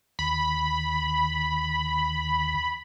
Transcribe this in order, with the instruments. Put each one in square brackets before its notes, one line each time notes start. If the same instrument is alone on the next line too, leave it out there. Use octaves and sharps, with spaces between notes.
[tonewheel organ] D#2 [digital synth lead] B5